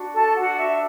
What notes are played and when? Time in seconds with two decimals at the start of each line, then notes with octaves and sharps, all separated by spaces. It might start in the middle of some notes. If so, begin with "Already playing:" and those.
Already playing: D4 F#4
0.14 A4 A5
0.35 D4 F#4 F#5
0.57 E5